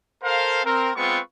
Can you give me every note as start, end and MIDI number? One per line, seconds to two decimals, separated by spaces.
0.23 0.61 69
0.23 0.61 70
0.23 0.61 72
0.23 0.61 77
0.65 0.91 60
0.65 0.91 70
0.96 1.19 56
0.96 1.19 59
0.96 1.19 60
0.96 1.19 65
0.96 1.19 71
0.96 1.19 85